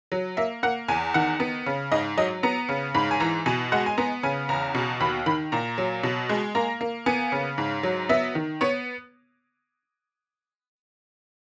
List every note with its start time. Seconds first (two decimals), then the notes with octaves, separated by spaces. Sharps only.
0.12 F#3
0.37 A#3 E5
0.63 A#3 F#5
0.88 E2 G#5
1.14 D#3 F#5
1.40 B3
1.66 C#3
1.92 G#2 D#5
2.17 F#3 D#5
2.43 B3 A#5
2.69 C#3
2.95 G#2 B5
3.11 G#5
3.20 E3 A#5
3.46 B2 G#5
3.72 G#3 F#5
3.86 G#5
3.97 B3 A#5
4.23 C#3 G#5
4.49 E2 A#5
4.75 B2
5.00 D#2 B5
5.26 D#3 B5
5.52 A#2 A#5
5.78 F#3
6.03 B2
6.29 G#3
6.55 A#3 A#5
6.81 A#3
7.06 B3 G#5
7.32 C#3
7.58 G#2
7.83 F#3
8.09 B3 E5
8.35 D#3
8.61 B3 C#5